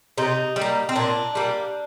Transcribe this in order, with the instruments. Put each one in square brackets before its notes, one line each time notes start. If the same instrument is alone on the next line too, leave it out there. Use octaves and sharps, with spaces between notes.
[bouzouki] C3 D#4
G3
A#3
C4
A#2 D4
G3 A#3